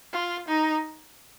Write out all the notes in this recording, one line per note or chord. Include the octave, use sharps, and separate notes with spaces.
F4
D#4